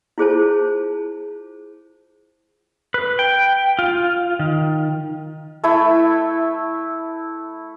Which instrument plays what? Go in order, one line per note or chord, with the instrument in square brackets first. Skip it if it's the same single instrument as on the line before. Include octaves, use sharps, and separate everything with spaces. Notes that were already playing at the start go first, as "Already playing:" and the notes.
[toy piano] E4 F4 G#4 C5 C#5 A5
[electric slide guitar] B4
G5
F4
D#3
[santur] A3 E4 E5